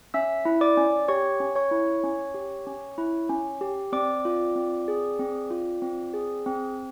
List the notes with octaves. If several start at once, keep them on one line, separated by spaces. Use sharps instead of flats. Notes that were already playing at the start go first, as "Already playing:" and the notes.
C#4 E5 E6
E4
D5 D6
C#4
G4 C#5 C#6
C#4
C#5 C#6
E4
C#4
G4
C#4
E4
C#4
G4
C4 D5 D6
F4
C4
G#4
C4
F4
C4
G#4
C4